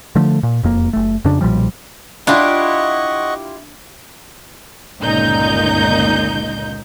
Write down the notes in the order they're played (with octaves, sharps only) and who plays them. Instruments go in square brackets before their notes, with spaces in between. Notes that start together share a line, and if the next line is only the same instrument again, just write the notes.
[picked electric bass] D3 F3 A3
A#2
E1 F2 A#3
F#1 A3
F2 C#3 D4
B1 A#2 F3 G3
[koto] D4 [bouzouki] E4 F4 G4 [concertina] D#5 F#5 C#6
[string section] G1 C#2 A#2 D#4 G6